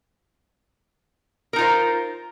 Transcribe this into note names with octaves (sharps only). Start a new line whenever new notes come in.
D#4 F4 A#4 C5